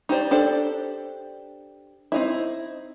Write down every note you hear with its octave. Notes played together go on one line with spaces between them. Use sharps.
D#4 G4 C5 D5
D4 G4 A4 C5 D5
C4 D#4 E4